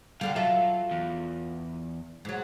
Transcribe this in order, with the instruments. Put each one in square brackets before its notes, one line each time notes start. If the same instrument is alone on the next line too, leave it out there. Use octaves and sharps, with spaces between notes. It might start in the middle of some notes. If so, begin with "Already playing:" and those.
[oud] F#2 D3 G3 [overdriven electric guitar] F5
[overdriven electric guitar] F#3 [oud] F4 A4 E5
[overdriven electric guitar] E2
[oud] G#2 F#3